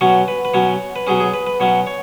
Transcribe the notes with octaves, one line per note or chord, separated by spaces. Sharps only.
B2 F#3 C#4 C#5
B4
B4
B2 F#3 C#4 C#5
B4
B2 F#3 C#4 G#4
G#4
B4
B4
B2 F#3 C#4 C#5
C#5